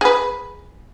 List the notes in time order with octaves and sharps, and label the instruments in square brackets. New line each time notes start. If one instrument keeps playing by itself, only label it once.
[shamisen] G#4 B4